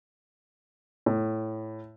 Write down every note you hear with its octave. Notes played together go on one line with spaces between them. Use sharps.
A2